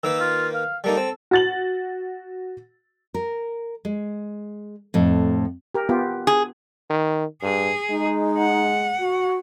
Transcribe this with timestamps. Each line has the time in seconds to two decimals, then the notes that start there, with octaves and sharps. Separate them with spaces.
0.04 D#3 A#3 B4 E6
0.21 F4
0.54 F5
0.84 G3 A#3 D#4 A4
0.97 C4
1.31 F#4 A6 F#7
3.14 A#4
3.85 G#3
4.94 F2 A2
5.75 G4 A#4
5.89 B3 F4 G4
6.27 G#4
6.90 D#3
7.42 G2 G#4
7.89 G#3 D#4
8.38 F#5
8.99 F#4